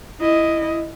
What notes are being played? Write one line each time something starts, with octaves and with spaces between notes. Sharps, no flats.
E4 D#5